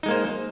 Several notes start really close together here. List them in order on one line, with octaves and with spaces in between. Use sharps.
D#4 G#3 A#3 C5